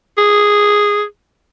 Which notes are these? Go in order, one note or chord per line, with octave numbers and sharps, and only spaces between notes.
G#4